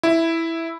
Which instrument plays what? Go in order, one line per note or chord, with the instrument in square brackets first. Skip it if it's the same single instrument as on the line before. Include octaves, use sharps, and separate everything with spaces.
[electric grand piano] E4